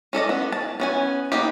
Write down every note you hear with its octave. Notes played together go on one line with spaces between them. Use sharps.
C#4 A4 D5 D#5
B3
A5
B3 C#4 G#5
A#3 B3 D#4 G4